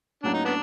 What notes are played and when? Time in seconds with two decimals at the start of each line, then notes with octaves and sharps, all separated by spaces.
0.23 A2 F#3 A#3 C#4 D4
0.34 D#4
0.45 B3 D4